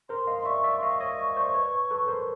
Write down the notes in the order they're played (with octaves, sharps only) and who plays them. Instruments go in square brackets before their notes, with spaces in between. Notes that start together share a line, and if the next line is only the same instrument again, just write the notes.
[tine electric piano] A#4 C5 [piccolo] C6
[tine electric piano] D#5 F5
[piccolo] C6
[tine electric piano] D5 E5 [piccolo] C#6
[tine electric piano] D5 E5
[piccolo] C6
[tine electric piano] D#5 F5 [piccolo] C#6
[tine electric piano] C#5 D#5
C5 D5
B4 C#5
A4 B4
A#4 C5